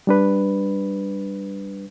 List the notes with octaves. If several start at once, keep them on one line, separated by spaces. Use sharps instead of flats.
G3 D4 B4